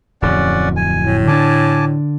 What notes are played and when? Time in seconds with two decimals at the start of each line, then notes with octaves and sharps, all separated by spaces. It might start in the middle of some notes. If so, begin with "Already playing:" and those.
0.22 D1 F2 C#4 D5 F#5
0.76 G#5
1.04 A2
1.28 D3 D4 G#5 A5 D6